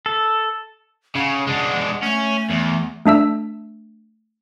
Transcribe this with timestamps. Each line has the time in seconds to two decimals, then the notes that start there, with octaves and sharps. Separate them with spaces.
0.06 A4
1.15 C#3 F#5
1.47 G#3 D4
2.03 A3 C#4
2.50 E2
3.05 A3 D4 E5 E6